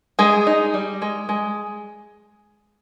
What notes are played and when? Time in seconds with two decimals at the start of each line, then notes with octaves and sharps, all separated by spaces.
0.19 G3 G#3 G#4
0.47 D#4
0.74 G3
1.02 G#3
1.29 G#3